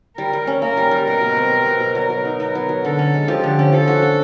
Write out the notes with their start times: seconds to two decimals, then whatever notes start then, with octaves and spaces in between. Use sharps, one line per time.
0.17 G3 A#4
0.33 G3
0.47 C#4
0.62 A#3 A#4
0.77 G3
0.91 G3
1.07 B2 A#4
1.21 B2
1.37 C4
1.51 G3
1.66 B2
1.80 B2
1.95 F#3 A#4
2.10 F#3
2.25 D#4
2.40 B3 A#4
2.55 F#3
2.69 F#3
2.85 D3 A4
2.99 C#4
3.14 G#3
3.28 F3 G4
3.44 D3
3.59 C#4
3.72 F3 A4
3.88 F#4
4.02 D4